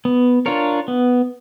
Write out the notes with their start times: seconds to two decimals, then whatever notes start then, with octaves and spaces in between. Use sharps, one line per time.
0.05 B3
0.46 D4 F4 A#4 C#5
0.88 B3